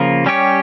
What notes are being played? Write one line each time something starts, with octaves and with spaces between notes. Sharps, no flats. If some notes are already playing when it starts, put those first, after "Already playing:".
Already playing: C#3 F3 A#3 F4
G3 C#4 G4 C#5